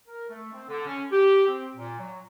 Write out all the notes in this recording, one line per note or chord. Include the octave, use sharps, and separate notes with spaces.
A#4
A3
C4
D3
C#4
G4
C4
A#2
F#3